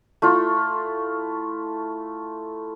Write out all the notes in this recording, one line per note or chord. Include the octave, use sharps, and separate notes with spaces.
A3 E4 F4